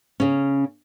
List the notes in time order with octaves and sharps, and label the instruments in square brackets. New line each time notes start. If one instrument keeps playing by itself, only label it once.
[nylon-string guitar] C#3 C#4